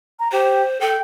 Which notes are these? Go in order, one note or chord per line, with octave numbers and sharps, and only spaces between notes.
A#5
G4 C5
A4 G5